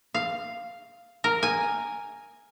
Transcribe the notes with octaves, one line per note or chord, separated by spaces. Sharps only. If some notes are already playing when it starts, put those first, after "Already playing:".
F5
A#4
G#5